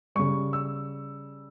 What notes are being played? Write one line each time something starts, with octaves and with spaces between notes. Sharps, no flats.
C#3 G3 C#6
E6